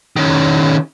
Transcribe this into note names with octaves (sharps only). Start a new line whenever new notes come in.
D#3 C#4